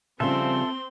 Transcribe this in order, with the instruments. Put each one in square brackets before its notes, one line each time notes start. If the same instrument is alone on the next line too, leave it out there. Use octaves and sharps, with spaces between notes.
[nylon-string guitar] C#3 F3 G3 [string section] C4 [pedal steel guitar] A4 E5 [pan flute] C6